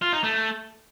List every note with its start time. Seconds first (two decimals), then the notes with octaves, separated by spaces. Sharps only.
0.02 F4
0.13 D#4
0.24 A3